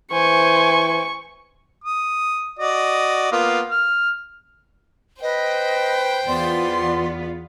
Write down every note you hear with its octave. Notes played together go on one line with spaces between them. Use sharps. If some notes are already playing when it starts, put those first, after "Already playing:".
E3 C5 G#5 C#6
D#6
F#4 D5 D#5
A#3 B3 F4
F6
B4 C5 D#5 G5
E2 B3 F4 D5 C6